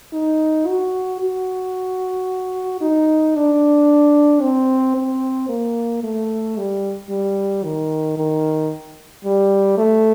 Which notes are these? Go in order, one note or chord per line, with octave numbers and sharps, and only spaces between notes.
D#4
F#4
F#4
D#4
D4
C4
C4
A#3
A3
G3
G3
D#3
D#3
G3
A3